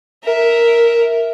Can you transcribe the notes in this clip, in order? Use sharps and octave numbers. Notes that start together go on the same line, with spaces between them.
A#4 E5